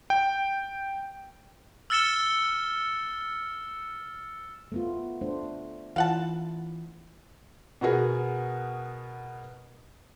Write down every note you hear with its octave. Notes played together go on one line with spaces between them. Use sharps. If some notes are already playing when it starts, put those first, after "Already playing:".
G5
E6 F6 A6 C#7 E7 G7
A3 B3 F4
A3 D4 C5
E3 E4 F4 F5 F#5 A5
B2 B3 F#4 G#4 A#4